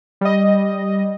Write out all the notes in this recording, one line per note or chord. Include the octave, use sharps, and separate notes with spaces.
G3 D#5